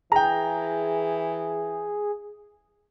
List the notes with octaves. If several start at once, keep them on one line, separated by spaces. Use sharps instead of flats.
E3 G#4 G5 A#5